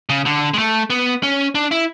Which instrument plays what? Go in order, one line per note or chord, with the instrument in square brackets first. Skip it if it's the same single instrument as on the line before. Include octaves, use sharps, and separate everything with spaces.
[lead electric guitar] C#3
D3
G#3
A3
B3
C#4
D4
E4